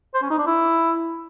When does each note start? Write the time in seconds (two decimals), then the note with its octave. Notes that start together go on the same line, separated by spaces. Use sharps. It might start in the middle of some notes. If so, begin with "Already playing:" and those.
0.14 C5
0.23 C#4
0.31 D#4
0.39 D4
0.47 E4